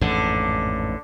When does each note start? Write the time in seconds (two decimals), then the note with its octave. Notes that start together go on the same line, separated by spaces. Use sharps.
0.01 A1 F2 G#2 D3